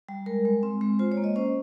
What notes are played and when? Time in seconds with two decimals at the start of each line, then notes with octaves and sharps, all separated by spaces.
0.09 G3
0.26 G#3 A#4
0.45 G#3
0.63 C4
0.81 G#3
0.99 F4 C5
1.12 C#5
1.17 A#3
1.24 D#5
1.36 C#4 C5